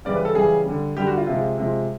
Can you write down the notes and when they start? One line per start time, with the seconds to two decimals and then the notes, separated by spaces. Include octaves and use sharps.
0.05 C#3 E3 G3 D5
0.15 B4
0.25 A4
0.35 C#3 E3 G3 G#4
0.66 D3 G3
0.97 D3 G3 G4
1.07 F#4
1.17 F4
1.27 C3 F3 G#3
1.58 C3 F3 G#3